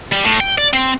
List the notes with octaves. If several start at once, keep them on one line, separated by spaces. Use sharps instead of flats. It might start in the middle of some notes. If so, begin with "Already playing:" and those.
G3
A2
G5
D5
C4